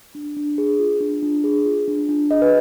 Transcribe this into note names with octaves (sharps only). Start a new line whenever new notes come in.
D4
D4
G#4
F4
D4
D4
G#4
F4
D4
D4
G#4 D#5
B4